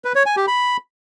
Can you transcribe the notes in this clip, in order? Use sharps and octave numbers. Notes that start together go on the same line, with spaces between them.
B4
C#5
G#5
G4
B5